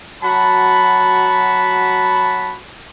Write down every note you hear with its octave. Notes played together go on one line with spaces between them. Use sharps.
F#3 F#4 A5 B5